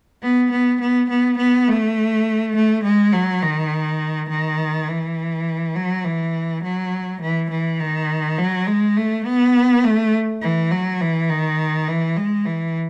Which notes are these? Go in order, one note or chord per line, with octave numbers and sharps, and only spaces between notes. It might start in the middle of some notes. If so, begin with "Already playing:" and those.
B3
B3
B3
B3
B3
A3
A3
G#3
F#3
D#3
D#3
E3
F#3
E3
F#3
E3
E3
D#3
F#3
G#3
A3
B3
A3
E3
F#3
E3
D#3
E3
G#3
E3